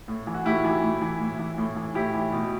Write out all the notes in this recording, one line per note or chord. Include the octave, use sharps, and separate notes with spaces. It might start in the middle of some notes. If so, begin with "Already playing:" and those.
A2
E3
F#4
A2 E4 G4
E3
A2
E3
A2
E3
A2
E3
A2 E4 G4
E3
B2